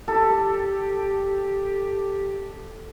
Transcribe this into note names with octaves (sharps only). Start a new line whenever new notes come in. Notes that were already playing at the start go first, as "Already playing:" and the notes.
G4 A4